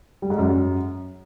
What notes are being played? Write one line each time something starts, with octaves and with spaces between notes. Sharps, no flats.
G3
G#2
F#2